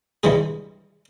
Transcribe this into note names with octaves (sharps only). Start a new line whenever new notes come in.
C2 G2 E3 G#3 G#4